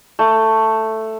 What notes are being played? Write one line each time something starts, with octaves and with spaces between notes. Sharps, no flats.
A3